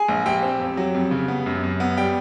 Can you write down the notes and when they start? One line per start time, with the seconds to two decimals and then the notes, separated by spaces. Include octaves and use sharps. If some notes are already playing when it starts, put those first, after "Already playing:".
Already playing: G#4 G#5
0.08 A#1
0.26 A#1 G4 G5
0.43 C4
0.60 F2
0.77 F#3
0.94 F2
1.11 C#3
1.28 B3
1.46 F#2
1.63 F#2
1.80 B3
1.97 G3 G4 G5